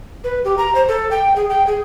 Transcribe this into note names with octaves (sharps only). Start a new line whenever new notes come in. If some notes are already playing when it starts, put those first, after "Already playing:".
B4
G4
A#5
C5
A4
G5
G#4
G5
G#4